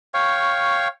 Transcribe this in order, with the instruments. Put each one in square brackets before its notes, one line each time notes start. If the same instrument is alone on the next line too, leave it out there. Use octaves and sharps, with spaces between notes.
[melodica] C#5 F5 G5 C#6